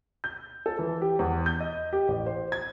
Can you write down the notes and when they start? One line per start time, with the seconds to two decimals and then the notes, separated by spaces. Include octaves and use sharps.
0.24 G6
0.66 A4
0.79 E3
1.02 G4
1.19 E2
1.46 G6
1.60 D#5
1.93 G4
2.08 A1
2.26 C5
2.52 G#6